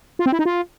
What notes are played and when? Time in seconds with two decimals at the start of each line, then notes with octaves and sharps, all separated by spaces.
0.19 F4
0.26 C4
0.32 E4
0.39 D#4
0.45 F4